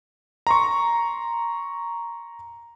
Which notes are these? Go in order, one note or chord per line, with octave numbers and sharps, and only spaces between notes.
A#5 C6 C#6